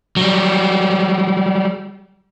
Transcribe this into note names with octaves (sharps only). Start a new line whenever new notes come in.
F#3 G3